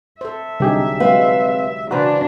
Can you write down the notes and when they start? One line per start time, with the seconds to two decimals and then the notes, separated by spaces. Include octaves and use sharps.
0.21 A4 C5 E5
0.60 C2 D3 F#3 D#4 G4 G#4
1.00 F#3 G#3 C4 B4 F5
1.91 C#3 E3 D4 F#4 B4 C5 A#5